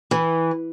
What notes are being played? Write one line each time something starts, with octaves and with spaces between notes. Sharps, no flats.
E3